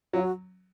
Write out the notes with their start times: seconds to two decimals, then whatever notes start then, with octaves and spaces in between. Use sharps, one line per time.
0.13 F#3 F4
0.22 F#4